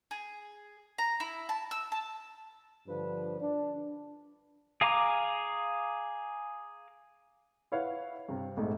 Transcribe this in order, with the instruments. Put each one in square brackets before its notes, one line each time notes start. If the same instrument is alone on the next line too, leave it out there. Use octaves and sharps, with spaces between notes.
[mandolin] G#4
A#5
E4
A5
E6
A5
[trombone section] G2 D3 F3 D4 B4
D4
[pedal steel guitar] G#4 F5 G#5 A#5 D6
[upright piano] E4 B4 C#5 F5 F#5
G2 C3
A#1 G#2 A3